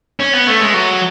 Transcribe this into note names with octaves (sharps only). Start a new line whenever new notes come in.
C#4
B3
A3
G#3
F#3